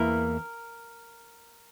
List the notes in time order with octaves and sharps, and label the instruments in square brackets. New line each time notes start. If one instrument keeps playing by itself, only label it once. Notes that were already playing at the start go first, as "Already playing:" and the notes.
Already playing: [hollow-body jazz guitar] E2 E3 A#3 E4 [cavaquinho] A#4